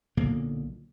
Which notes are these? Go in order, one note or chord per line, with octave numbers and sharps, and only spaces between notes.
B1 A#2 D3 A#3